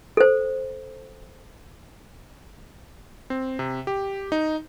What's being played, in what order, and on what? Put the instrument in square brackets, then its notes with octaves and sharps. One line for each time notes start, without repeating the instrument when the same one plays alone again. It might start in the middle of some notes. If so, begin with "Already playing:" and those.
[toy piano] A4 C5
[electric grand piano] C4
C3
G4
D#4